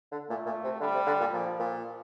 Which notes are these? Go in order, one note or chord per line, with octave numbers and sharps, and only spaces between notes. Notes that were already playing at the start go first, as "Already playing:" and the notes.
D3
A#2 A3
A#2
C3
D3 G3
C3
D3
A#2
A#2 F3
A#2